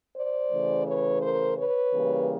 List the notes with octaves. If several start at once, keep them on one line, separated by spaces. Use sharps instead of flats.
C5 D5
C#3 E3 A3
B4 C#5
A#4 C5
B4 C#5
C#3 E3 G3 A#3